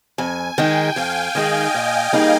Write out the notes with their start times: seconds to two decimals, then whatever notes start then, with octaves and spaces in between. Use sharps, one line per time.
0.18 F2 G#5
0.58 D#3 G#3 D#4 G#4 G5
0.96 F2 F5
1.35 D#3 G#3 D#4 G#4 D#5
1.74 A#2
2.13 G3 A#3 D#4 G#4